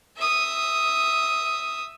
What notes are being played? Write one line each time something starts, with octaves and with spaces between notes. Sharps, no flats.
E5 D#6